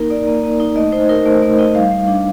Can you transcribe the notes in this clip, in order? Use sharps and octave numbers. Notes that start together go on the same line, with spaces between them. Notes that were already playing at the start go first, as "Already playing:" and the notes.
Already playing: A#3 D#4 A#4
D#4 D5
A#3
A#3
D#4
A3 D#5
D#4 C5
D#4 A#4
A3 C5
A3
D#4 D#5
G3 F5
G3
D4